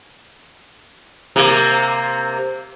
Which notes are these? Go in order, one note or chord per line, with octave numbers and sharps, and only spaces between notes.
C3 A#3